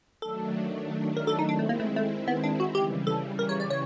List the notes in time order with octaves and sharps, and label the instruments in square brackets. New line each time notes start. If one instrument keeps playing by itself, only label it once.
[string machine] D#3 F#3 A3 D4 [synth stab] A4
[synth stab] A#4
A4
D#4
[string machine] D#3 G#3 C4 E4 [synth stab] D4
[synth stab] A3
A#3
A3
A3
B3
D4
F#4
[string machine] C#3 E3 G3 [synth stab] G4
[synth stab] A4
A#4
C#5
D5
C#5